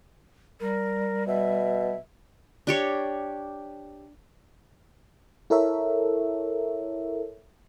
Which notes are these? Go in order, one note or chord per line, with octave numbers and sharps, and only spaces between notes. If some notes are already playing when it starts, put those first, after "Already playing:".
G3 A#4
B2 E5
D4 G4 C#5
E4 A4 A#4 C#5 E5